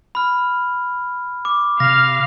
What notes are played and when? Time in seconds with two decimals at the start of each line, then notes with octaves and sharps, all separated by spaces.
0.15 B5 F6
1.45 D6
1.80 C3 F5 F6 A#6